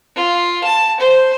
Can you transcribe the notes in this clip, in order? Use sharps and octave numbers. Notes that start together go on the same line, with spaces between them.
F4
A5
C5